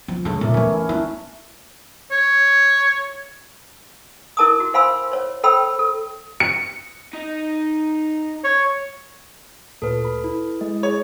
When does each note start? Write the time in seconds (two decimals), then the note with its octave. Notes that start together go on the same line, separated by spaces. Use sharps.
0.08 F3
0.25 D3 G#3 A4 C#5
0.41 A#2 A#4 D5 E5
0.54 E3 A3 C#4
0.73 E4
0.89 D4 E4
2.12 C#5
4.37 E4 A#4 A5 D6 D#6
4.60 F#4
4.74 C5 F5 G#5 B5 C6 E6
5.12 C5 C#5
5.44 A4 C5 G5 B5 E6
5.79 A4
6.40 C#7
7.13 D#4
8.44 C#5
9.82 D2 A#2 A4 B4
10.04 B5
10.24 E4
10.61 G#3 D#5
10.83 G#4 C#5